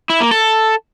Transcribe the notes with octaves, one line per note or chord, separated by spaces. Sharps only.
E4
A#3
A4